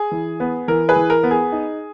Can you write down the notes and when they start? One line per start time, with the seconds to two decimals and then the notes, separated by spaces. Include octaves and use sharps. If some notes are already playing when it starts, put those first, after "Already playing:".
Already playing: G#4
0.11 E3
0.40 B3
0.68 E3 A#4
0.89 G#4 B4
0.96 E3
1.10 A#4
1.23 B3
1.31 G#4
1.52 D#4